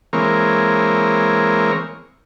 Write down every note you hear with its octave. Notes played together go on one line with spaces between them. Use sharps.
E3 G#3 A#3 C4 A#4 C#5